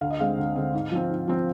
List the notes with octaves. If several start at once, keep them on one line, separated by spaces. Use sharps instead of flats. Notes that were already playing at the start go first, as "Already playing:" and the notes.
D2 F5
D#5
D3 G#3 C4 F5
D2
D3 G#3 C4
G#2
F3 C4
G#2
F3 C4